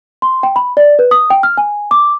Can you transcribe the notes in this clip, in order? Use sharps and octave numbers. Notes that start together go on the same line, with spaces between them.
C6
G5
B5
D5
B4
D#6
G5
F6
G#5
D6